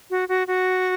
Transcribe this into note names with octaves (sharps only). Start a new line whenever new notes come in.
F#4
F#4
F#4